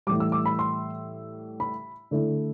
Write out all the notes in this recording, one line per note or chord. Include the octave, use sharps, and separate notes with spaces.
A2 E3 G3 D6
E6
D6
B5
C6
B5
D3 A3 E4